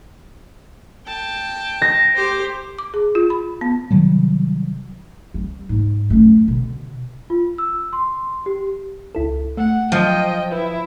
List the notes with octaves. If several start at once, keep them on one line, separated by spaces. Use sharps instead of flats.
G5 A5
A#6
G4 C5
D6
G#4
F4
B5
B3
C3 D#3 F#3 G3
G3
G#2
F#2 A3
B2 D3
F4
E6
C6
G4
C#2 E4 A4
A3 F#5
F3 F#3 D#5 G5
E4 B4